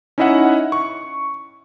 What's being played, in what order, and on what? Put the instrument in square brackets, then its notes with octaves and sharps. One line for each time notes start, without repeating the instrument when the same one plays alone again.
[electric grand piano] C#4 D#4 E4 D#5 E5 F#5
C#6